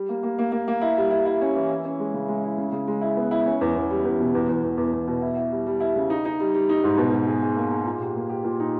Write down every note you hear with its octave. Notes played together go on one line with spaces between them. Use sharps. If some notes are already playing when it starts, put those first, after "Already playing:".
Already playing: G3
A#3
A#3
A#3
A#3
A#3
E4
G3
E4
E4
C#4
E3
E4
C#4
G#3
C#3
G#3
E4
C#3
C#3
G#3
E4
B3
E4
C#4
E2
E2
G3
E2
B2
E2
E2
E2
E2
E2
B2
E4
E4
G3
G3
E4
C#3
D#4
D#4
G3
G3
D#4
G#2
B2
B2
G#4
G#4
A#3
G#4
A#2
G4
A#3
G4
A#2
D#4